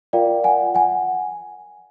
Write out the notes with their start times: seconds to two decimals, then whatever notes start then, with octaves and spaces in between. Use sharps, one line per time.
0.13 F4 A#4 D5 F5 G5
0.44 F#5 G#5
0.74 F#5 G#5